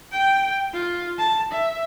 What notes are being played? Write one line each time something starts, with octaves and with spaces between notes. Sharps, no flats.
G5
F4
A5
E5